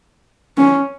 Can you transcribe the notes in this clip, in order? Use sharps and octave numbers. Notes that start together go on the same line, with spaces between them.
C#4